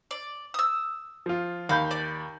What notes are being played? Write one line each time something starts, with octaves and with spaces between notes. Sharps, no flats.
D5
D#6 E6
F3 F4
D#2 F5 B5 G6
D5